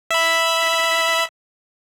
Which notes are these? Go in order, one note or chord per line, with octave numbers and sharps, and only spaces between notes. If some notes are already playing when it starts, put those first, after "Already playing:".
E5 B5